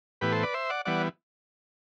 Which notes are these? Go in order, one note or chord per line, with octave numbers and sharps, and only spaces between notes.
A2 E3 B3 G4 B4
A4 C5
B4 D5
C5 E5
D5 F#5
E3 G3 B3 D5 F#5